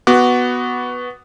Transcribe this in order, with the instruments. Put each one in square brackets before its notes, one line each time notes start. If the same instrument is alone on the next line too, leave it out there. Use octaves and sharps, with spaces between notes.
[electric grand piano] B3 F#4 D6 F#6